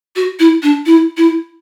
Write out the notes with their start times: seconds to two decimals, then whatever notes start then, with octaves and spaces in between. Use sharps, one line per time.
0.16 F#4
0.39 E4
0.63 D4
0.86 E4
1.17 E4